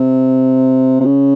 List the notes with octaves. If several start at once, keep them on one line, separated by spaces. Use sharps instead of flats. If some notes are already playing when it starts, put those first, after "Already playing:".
Already playing: C3
C3
C#3